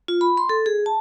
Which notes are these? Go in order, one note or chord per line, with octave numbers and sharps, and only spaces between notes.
F4
B5
C6
A4
G#4
A5